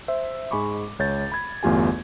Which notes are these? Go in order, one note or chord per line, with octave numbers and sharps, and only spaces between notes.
C5 E5
G#2 G#3 G#5 B5 C#6 D6
C#2 C#5 G6 A6
B5 G#6
G1 E2 A3 F4 G4 G#5